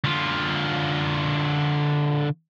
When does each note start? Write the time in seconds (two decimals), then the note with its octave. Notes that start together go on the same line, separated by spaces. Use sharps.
0.04 D3 F4